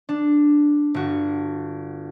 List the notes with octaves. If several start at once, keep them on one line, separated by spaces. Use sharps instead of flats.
D4
G1 F#4